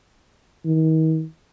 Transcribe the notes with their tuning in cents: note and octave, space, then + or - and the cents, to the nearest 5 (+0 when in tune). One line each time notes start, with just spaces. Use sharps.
D#3 +40